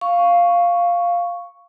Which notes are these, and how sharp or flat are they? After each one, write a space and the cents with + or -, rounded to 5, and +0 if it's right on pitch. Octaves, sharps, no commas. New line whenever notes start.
F5 +0 C#6 +0